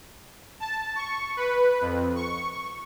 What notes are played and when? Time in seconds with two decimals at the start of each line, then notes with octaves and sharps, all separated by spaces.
0.60 A5
0.96 C#6
1.37 B4
1.81 F2
2.15 C#6